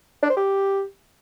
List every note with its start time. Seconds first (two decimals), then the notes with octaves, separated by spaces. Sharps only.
0.22 D4
0.30 C5
0.37 G4